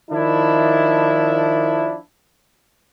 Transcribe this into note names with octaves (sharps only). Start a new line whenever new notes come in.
D#3 F3 D4 E4